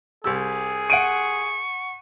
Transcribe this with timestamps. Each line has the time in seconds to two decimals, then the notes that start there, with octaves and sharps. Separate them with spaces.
0.24 C2 G4 G#4 E6
0.90 F#5 C#6 D7 D#7